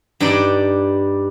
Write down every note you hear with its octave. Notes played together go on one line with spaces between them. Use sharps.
G2 D4 D#4 D5